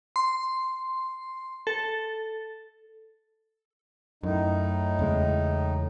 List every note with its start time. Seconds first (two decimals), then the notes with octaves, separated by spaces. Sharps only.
0.16 C6
1.67 A4
4.23 F#2 A2 D#4
4.99 E2 C#3 G#3